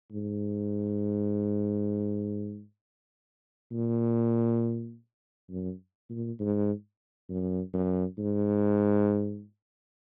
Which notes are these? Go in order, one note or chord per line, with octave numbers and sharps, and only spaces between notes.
G#2
A#2
F#2
A#2
G#2
F#2
F#2
G#2